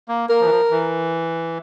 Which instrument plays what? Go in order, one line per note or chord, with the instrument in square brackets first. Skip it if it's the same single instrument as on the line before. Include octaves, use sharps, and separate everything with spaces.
[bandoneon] A#3
[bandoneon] A#3 [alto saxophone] A#4
[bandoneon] F3
E3
F3
E3